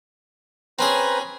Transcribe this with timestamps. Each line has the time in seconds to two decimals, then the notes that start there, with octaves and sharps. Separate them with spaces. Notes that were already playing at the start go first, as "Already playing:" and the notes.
0.79 C4 C#4 G#4 B4 C5 A#5